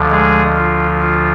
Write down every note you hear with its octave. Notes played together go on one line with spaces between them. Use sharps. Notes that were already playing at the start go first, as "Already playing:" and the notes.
Already playing: D2 D3 F3
G#3 G#4
F4
F4